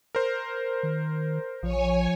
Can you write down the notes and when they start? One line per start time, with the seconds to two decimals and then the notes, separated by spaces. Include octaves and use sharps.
0.15 A#4 C5
0.83 D#3
1.63 A#1 F3 C#5 G#5